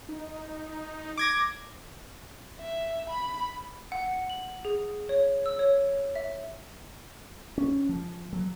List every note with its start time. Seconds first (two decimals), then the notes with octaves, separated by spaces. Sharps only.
0.09 D#4
1.17 D6 G#6 A#6
2.60 E5
3.10 B5
3.92 F#5
4.06 C#7
4.30 F#7
4.65 G#4
5.09 C#5
5.46 E6
5.59 C#5
6.15 E5
7.58 C#4
7.89 F3
8.33 F#3